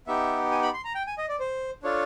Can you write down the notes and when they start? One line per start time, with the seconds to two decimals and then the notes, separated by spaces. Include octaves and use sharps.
0.07 B3 D#4 G4 E5
0.51 G#5
0.62 B5
0.74 C6
0.85 A#5
0.95 G5
1.07 G#5
1.18 D#5
1.29 D5
1.40 C5
1.83 D4 F4 A4 C#5